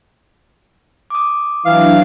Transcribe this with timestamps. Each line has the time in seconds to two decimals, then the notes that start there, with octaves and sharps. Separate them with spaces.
1.10 D6 D#6
1.65 E3 F#3 D4 F5